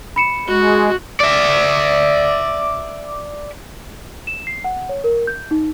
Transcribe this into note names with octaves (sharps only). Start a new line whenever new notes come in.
B5 C#7 E7
G#3 F#4
D5 E5
E7
C7
F#5
C#5
A#4
G6
D#4